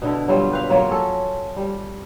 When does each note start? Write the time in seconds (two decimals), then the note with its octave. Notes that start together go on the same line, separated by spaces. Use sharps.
0.02 B2 D3 E4
0.28 F#3 G3 F4
0.51 G4 B4 F5
0.70 F#3 A#3 F4 C#5
0.89 C#4 A4
1.56 G3